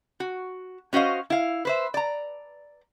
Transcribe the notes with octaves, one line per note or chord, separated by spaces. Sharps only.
F#4
C#4 F#4 C5 D#5 F5
E4 F5
B4 C5 E5
D5 A#5